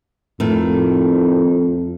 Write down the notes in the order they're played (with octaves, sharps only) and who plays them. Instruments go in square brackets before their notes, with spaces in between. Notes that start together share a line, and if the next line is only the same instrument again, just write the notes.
[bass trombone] F2 [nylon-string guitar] A2 D#3